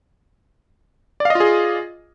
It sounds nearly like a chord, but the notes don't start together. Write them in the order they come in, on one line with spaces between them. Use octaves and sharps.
D5 F5 D#5 F4 G#4